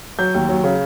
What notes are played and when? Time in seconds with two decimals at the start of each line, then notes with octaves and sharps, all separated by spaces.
0.19 F#3 G6
0.34 D#2
0.49 F#3
0.64 C#3